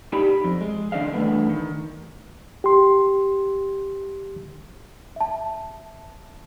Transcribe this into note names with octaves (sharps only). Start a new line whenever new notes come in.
D#4 G4 D5 B5
F2
G#3
D#3 D4 D5 D#5 F5
E2 G2 A3 B3 D4
D#3
G4 C6
E5 A5